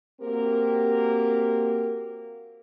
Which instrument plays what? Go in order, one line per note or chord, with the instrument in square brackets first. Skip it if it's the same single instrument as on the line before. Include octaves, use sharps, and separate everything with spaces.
[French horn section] A#3 C4 F#4 G4 A#4